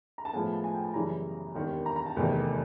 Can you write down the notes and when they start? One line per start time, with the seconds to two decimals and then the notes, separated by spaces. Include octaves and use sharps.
0.18 A#5
0.25 A5
0.33 A2 F3 G#3 B3 G#5
0.53 A5
0.64 G#5
0.74 G5
0.84 A5
0.94 F#2 C#3 E3 G3 A#5
1.55 E1 D#2 D#3 G3
1.86 A#5
1.96 A#5
2.06 A5
2.16 F1 E2 C3 D#3